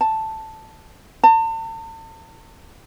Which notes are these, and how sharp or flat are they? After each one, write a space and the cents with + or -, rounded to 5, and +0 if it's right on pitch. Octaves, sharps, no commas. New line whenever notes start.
A5 +0
A5 +40